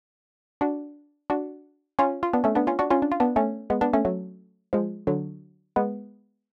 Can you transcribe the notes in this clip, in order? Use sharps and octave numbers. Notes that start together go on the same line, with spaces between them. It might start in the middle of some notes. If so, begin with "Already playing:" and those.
D4 F#4
D4 F#4
C#4 F4
F4
B3 D4
A3 C#4
B3 D4
C#4 F4
D4 F#4
C#4 F4
D4
F4
B3 D4
A3 C#4
G#3 B3
B3 D4
A3 C#4
F#3 A3
F3 G#3
D3 F#3
G#3 B3